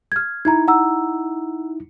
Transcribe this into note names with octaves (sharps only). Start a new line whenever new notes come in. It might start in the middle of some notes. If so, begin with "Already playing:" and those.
F6 G#6
D#4 E4 A#5 G#6
F#5 A#5 E6